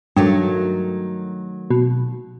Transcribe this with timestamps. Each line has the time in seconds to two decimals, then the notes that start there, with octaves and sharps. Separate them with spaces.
0.17 G2 D#3 F#3 A3
1.70 B2